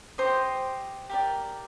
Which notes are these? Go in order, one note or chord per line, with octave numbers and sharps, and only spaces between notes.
G4 C5 D#5 C6
G4 A#4 D5